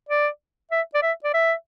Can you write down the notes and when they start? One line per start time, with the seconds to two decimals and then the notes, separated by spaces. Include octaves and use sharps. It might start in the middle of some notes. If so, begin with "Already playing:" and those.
0.09 D5
0.71 E5
0.94 D5
1.02 E5
1.24 D5
1.34 E5